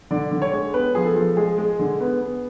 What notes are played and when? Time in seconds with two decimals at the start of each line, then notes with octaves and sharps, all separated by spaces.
0.11 D3 D5
0.31 D3
0.42 C#5
0.53 G#3
0.74 B3 B4
0.95 F3 G#4
1.06 A4
1.15 F3
1.37 G#3 G#4
1.58 G#3
1.79 D3
2.00 B3
2.21 B3